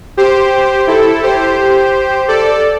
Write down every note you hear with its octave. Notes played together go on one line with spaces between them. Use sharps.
G4 C5
E4 A4
G4 C5
A4 D5